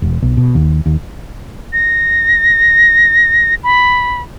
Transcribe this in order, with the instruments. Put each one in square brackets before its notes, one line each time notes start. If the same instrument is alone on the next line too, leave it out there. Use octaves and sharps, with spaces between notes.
[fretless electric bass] E1
B1
B2
D#2
D#2
[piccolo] A#6
B5